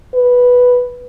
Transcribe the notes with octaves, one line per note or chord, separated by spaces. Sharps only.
B4